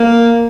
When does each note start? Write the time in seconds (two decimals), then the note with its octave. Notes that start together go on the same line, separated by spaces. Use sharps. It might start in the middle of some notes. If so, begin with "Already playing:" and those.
Already playing: A#3